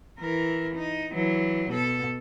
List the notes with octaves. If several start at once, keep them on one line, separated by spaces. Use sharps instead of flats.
E3 A#4
D#4
E3 F#3
B2 A4